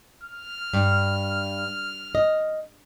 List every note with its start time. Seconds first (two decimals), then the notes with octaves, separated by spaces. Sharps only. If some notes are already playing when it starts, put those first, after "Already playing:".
0.23 F6
0.73 G2
2.15 D#5